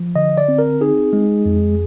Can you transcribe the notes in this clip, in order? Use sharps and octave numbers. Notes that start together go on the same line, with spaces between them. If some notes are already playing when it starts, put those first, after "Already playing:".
Already playing: F3
D3 D#5
D5
C4
A#4
D#4 G#4
G#3
F2